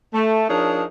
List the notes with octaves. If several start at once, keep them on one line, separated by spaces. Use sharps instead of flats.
A3
F3 D4 D#4 G#4 A#4 C#5